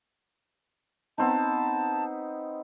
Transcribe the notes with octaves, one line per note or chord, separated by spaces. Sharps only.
B3 C4 D#4 A5